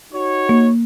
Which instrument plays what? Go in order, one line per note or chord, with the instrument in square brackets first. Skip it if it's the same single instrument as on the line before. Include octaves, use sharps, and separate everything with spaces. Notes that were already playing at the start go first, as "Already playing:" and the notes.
[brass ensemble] D#4 F#4 C#5
[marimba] A#3